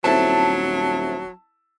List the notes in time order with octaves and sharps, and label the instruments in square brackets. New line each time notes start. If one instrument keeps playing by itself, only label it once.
[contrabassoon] D#1 [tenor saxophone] F#3 [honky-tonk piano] C4 E4 A4 [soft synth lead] A5